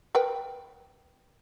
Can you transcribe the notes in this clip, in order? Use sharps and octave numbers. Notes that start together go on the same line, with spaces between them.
A#4 B4 G5